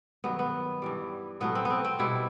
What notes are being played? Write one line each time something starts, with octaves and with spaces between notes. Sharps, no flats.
G2 D#3 F#3 B3
B3
G2 E3 G3
A2 F#3 A3 B3
C4
B3
C4
C4
B2 G3 E4